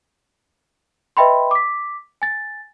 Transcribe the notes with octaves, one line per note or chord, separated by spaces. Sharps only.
B4 D#5 E5 G5 B5 C6
D6 B6
G#5 A6